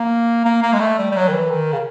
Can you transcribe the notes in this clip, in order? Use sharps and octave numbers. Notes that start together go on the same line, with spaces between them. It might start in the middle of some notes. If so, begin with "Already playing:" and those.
Already playing: A#3
A#3
A#3
G#3
A3
G3
G3
F#3
D#3
E3
D#3
C#3